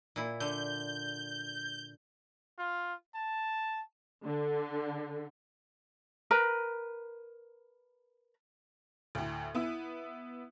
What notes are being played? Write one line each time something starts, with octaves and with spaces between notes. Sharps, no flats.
A#2 E4
D3 G6
F4
A5
D3
A#4 B4 A#5
D2 A2
B3 E4